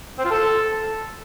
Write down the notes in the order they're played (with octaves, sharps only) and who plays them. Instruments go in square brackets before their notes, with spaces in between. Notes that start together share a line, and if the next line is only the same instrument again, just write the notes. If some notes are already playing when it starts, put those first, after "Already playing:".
[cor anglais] C4
F4
A4